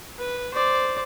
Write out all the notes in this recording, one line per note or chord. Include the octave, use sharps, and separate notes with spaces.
B4
C5 D5